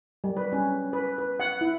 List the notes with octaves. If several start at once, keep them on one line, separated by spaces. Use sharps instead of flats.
G3
B4
C#4
B4
B4
F#5
E4